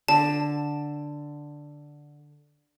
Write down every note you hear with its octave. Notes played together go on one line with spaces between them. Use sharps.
D3 A5